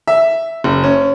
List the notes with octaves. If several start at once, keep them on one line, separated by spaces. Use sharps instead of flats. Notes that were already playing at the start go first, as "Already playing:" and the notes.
E5
F#1
C#4